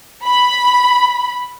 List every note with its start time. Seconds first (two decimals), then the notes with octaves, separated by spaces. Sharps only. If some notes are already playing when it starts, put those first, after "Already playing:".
0.25 B5